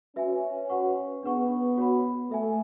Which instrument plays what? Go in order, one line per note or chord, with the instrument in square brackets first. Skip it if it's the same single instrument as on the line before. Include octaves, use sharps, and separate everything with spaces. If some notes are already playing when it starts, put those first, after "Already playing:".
[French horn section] C#4 [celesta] F#4 B4 E5 G#5
[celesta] F#4 B4 F#5 C#6
[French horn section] B3 [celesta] D4 G#4 B4 F#5 C#6
[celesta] F#4 C#5 F#5 B5
[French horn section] A3 [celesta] A4 E5 G#5